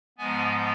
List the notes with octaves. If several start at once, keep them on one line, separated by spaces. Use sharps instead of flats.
G#2 F3 G#3 B3 G#5